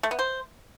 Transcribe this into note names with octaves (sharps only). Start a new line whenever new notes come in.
A3
B3
C5